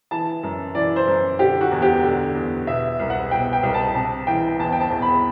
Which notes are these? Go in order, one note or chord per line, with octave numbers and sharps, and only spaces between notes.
E3 A5
F#2
E3 D5
C5
F#2
D3 G4
F#4
E2
G4
D3
E2
B2 E5
C2
F#5
B2 G5
G5
C2 G5
A5
C3 A5
E3 G5
E2 A5
G5
A5
E2
B5